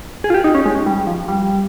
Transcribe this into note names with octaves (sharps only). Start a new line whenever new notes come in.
G#4
F4
G4
D#4
C#4
G#3
G3
F3
G3